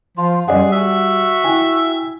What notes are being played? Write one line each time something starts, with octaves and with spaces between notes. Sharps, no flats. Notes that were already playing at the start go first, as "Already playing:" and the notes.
F3 F4
F#2 G3 G#4 D5 F#5
F#4 E5
E4 G5 G#5